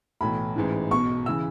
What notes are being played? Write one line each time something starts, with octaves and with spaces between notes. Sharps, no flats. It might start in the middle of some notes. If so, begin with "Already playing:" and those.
B1 A2 E3 B5
A1 G#2 E3
B1 B2 C#6
C#3 E3 E6